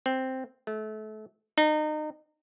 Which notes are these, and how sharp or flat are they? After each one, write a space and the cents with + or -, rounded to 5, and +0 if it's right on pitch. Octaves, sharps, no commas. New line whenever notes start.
C4 +0
A3 -30
D#4 -30